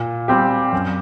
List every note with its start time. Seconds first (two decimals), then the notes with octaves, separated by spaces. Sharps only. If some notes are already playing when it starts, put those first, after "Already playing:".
Already playing: A#2
0.28 G3 C4 G4
0.73 F#2